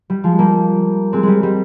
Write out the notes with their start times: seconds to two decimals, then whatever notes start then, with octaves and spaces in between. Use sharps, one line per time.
0.10 G3
0.24 F3 G#3
0.39 G3 A#3
1.13 G#3 C4
1.23 G3 G#3
1.43 G3